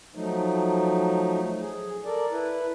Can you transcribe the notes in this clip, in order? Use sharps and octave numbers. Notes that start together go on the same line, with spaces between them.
F3 F#3 A3 D#4
G#4
A4 A#4 D5
E4 B4